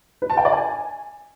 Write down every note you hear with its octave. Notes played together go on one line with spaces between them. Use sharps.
B4
A5
G5
D5
G#5